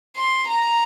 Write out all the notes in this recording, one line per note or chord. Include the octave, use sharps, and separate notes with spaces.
C6
A#5